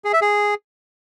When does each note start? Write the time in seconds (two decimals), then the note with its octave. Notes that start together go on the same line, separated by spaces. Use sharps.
0.04 G#4
0.13 E5
0.22 G#4